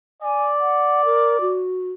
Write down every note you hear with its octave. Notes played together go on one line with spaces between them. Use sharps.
D5 G#5
F#5
A#4
F#4